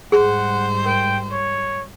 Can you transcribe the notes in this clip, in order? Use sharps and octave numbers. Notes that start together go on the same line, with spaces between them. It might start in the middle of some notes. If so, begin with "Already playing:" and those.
G#2 G3 G#4 C5 F#5
A#4 G5
C#5